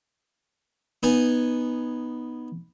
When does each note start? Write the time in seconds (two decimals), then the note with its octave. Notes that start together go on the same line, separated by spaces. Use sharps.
1.03 B3 D#4 G#5